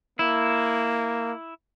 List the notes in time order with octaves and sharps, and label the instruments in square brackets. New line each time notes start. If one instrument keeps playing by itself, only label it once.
[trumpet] A#3 [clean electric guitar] E4